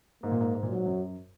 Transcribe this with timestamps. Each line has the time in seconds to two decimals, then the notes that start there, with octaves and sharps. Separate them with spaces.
0.23 G#2 A#3
0.31 A#2
0.41 G#2
0.55 G#2
0.63 A#2
0.70 G#2 F#3
0.86 F#2